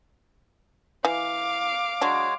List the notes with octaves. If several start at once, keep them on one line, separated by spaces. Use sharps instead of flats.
E3 F5 D6
F#3 G#3 D4 F#4 C#5